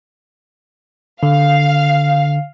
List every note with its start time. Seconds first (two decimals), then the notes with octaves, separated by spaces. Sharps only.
1.23 D3 F5